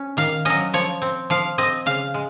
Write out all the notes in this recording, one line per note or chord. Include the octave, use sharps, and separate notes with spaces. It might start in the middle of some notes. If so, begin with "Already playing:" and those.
Already playing: C#4
D#3 F5
F#3 C#4 D#5
F3 C#5
C4
F3 F5
C4 D#5
C#3 F5
G#3